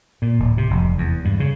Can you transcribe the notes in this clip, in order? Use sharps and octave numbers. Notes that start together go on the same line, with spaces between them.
A#2
D1
C3
F1
E2
G2
C#3